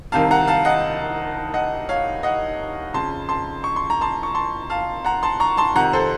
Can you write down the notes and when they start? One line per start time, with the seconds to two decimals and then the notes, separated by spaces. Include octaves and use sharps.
0.12 C2 C3 D#3 F5 A5
0.31 F#5 A#5
0.48 F5 A5
0.65 D#5 F#5
1.54 D#5 F#5
1.89 C#5 F5
2.23 D#5 F#5
2.94 F2 C#3 A5 C6
3.29 A5 C6
3.64 C#6
3.76 C6
3.90 A#5
4.01 A5 C6
4.23 C#6
4.35 A5 C6
4.70 F5 A5
5.05 F#5 A#5
5.23 A5 C6
5.40 A#5 C#6
5.57 A5 C6
5.75 F2 C3 D#3 F#5 A#5
5.93 A4 C5